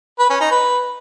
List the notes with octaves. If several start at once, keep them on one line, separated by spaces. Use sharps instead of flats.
B4
C#4
D#4
B4